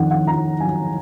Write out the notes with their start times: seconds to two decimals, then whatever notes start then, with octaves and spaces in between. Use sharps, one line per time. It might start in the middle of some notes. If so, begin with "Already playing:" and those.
Already playing: F2 D#3 F#5
0.11 F#5
0.27 F2 A#5
0.60 F#3 G#5